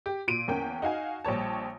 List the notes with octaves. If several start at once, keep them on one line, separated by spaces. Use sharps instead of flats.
G4
A#2 D7 D#7
E2 A#3 C#4 G5
D#4 F#4 F5 G#5
A#1 G3 C#5 A5